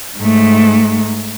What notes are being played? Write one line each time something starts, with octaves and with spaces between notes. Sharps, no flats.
G#2 A3